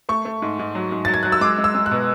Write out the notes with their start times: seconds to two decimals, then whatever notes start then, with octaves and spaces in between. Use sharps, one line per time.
0.09 A3 C#6
0.25 A3
0.42 G#2
0.59 G#2
0.75 F#3
0.92 G#2
1.05 F#3 A6
1.14 G#6
1.23 F#3 F#6
1.32 E6
1.41 G#3 D6
1.58 G#3
1.64 E6
1.75 G#3
1.86 F#6
1.91 B2